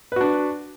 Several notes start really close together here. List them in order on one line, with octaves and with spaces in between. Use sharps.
B4 F#4 D4